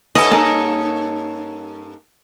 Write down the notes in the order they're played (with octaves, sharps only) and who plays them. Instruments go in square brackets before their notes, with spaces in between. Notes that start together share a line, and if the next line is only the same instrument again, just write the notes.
[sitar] G2 C#4 A4 [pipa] E3 [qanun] D#5
[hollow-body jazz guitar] A#3 D#4 A#4 [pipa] G#4